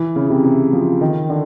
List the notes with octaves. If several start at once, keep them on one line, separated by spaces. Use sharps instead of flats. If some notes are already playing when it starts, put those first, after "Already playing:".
Already playing: E3
C#3
C3
C3
F3
D#3
D3